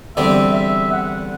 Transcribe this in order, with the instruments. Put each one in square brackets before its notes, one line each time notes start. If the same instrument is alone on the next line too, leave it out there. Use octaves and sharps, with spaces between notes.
[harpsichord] E2 D3 G3 C4 [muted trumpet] E5
[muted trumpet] E5
F#5